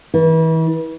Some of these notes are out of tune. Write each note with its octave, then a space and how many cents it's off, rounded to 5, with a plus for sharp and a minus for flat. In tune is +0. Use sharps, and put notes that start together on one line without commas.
E3 -35